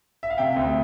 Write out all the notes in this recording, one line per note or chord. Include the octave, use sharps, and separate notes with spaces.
E5
F5
C3 E5 G5
D2